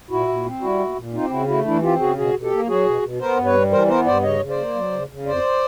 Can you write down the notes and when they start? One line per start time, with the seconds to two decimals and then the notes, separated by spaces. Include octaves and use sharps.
0.10 A#2 E4 F#4
0.28 A#2
0.45 C4
0.61 G3 E4 F#4
0.79 A#2
0.96 A#2
1.13 C4 D#4 F4
1.23 G4
1.30 C#3 E4 F#4
1.48 A3 E4 F#4
1.65 E3 D4 E4
1.82 C4 F4 G4
1.99 C#3 F#4 G#4
2.17 B2 F#4 G#4
2.34 B2
2.43 G4 A4
2.51 A#3
2.68 F#3 F#4 G#4
2.86 B2
3.02 B2
3.20 B3 A#4 C5
3.38 G2
3.45 B4 C#5
3.54 G3
3.71 E3 A#4 C5
3.88 B3 A#4 C5
4.06 G2 C5 D5
4.22 C#3 C#5 D#5
4.40 C#3
4.49 C5 D5
4.57 A#3
4.75 F#3
4.92 C#3
5.09 C#3
5.26 F2 C5 D5